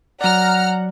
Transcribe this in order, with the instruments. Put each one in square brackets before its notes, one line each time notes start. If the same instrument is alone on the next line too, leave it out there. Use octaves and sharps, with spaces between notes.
[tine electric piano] F#3 D5 [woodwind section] F#5 [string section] A#5 F6